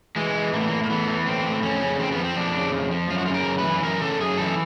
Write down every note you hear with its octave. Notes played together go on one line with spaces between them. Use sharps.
E3 G#3
E3
A2 A#3
B3
A2 A#3
A#3
E3 B3
E3
A2 C4
A2
F2 C#4
C#3
F2 C4
B3
F3
C4
F2 D4
C#3
F2
F3
F#2 F4
F#4
C#3 F4
A#4
F#2
B4
E3
F#2 A#4
C#3 A4
F#2 G#4
E3 A4